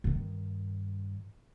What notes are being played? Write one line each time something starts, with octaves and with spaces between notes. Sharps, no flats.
G2 D#3